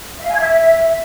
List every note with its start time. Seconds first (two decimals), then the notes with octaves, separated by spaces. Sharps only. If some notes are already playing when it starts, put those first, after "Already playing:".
0.19 E5
0.24 F5
0.29 G#5
0.34 G#6
0.39 E5